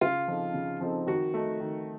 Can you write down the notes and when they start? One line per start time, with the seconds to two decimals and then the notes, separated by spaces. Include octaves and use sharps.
0.01 C#3 F4
0.28 F3 C4 D#4 A4
0.54 C#3
0.80 F3 C4 D#4 A4
1.06 D#3 F#4
1.34 A3 D#4
1.60 D#3